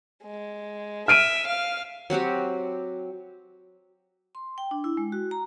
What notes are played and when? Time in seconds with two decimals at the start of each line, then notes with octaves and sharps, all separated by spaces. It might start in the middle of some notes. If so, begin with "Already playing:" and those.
0.23 G#3
1.08 E5 F6 D7 D#7
1.47 F5
2.10 F#3 C4 F#4 G4
4.35 C6
4.58 G5
4.71 D4
4.84 E4
4.97 G#3
5.12 F#4
5.31 A#5